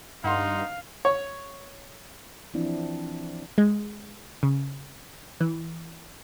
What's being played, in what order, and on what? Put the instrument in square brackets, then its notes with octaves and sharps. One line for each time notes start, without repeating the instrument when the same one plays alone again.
[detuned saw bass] G2 [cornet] D#4 [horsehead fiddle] F5 [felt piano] F#5 C6
[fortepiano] C#5
[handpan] E3 F3 C4 D4 E4
[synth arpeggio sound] G#3
C#3
E3